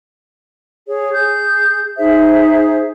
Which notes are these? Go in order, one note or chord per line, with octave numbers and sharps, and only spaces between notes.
G#4 C#5
G#4 G6
D#4 G#4 C5 E5